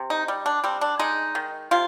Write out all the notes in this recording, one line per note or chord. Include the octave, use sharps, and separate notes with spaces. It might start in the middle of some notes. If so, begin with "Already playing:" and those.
Already playing: C3
D#4
G3
D4
G3 C4
D4
G#3 D#4
D#3
C3 F4